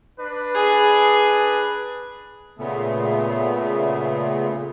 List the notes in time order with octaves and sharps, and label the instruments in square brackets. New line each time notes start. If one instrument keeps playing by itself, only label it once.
[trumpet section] D4 B4
[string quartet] G#4
[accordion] A#2 C#3 A3 B3